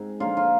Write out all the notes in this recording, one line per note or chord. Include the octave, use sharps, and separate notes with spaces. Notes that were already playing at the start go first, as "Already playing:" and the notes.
Already playing: G#2 C4
D3 F3 A#3 F4
F4